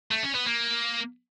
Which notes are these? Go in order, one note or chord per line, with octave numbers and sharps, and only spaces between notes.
A3
C#4
B3
A#3